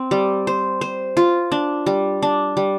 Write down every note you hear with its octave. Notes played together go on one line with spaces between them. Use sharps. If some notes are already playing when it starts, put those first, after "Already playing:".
Already playing: C4
G3
C5
C5
F4
D4
G3
D4
G3